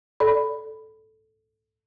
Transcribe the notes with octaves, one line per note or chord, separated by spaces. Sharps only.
A4 D5 B5